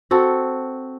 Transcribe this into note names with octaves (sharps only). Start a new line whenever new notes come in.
C4 F#4 A4